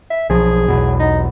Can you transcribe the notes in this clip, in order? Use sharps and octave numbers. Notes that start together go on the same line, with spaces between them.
E5
B1 F3 G#4
B1 E2 B2
D#4